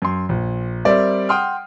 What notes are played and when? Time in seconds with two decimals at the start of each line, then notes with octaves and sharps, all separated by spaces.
0.02 F#2 C6
0.29 A#1
0.85 G3 C4 A#4 D5 E5
1.29 F#5 G5 C6 D#6 F6